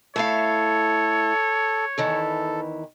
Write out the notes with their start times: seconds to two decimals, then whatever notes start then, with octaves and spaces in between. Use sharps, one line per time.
0.16 A3 E4 A4 C#5 F5
1.98 E2 D#3 E3 A4